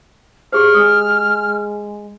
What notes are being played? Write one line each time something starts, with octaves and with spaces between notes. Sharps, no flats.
G4 G#4 C5 F6
G#3 D#6